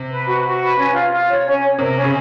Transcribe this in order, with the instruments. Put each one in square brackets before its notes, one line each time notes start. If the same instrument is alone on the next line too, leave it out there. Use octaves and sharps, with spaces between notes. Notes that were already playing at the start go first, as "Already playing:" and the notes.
Already playing: [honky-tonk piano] C3
[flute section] B4
F#4
F#4
B4
C#4
F4
F4
C#5
C#4
C#5
[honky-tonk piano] C3 [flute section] A#4
[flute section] C#4
[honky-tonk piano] C#3